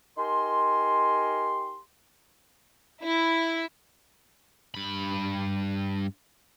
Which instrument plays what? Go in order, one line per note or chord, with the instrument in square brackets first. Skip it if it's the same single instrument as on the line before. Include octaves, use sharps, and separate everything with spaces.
[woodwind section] D#4 G4 A#4 G#5 C6
[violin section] E4
[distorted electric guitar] G2 B5